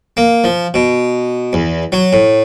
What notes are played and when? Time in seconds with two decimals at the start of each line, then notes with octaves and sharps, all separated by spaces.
0.17 A#3
0.44 F3
0.74 B2
1.53 E2
1.92 F#3
2.13 A2